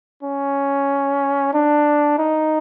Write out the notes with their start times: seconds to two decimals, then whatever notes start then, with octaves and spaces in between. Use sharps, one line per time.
0.23 C#4
1.54 D4
2.18 D#4